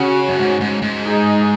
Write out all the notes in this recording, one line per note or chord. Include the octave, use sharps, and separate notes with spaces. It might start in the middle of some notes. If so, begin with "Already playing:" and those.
Already playing: C#3 C#4 F#4
F#2
G#2
G#2
G#2
D#4 G#4